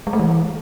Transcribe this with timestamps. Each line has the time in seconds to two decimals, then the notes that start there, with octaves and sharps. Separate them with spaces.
0.07 G#3
0.13 A3
0.19 E3